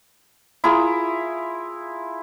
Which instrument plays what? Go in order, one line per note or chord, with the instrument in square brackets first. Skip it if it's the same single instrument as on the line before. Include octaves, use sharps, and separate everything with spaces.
[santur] E4 F4 G#4 A#4